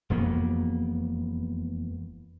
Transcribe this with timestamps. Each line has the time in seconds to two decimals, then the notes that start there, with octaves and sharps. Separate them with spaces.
0.10 E1 F2 A#3 B3